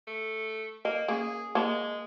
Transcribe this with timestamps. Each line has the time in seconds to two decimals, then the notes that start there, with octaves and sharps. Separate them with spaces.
0.07 A3
0.85 A#3 D#5
1.08 A#3 C#4 G#4
1.55 G#3 A#3 C5 A#5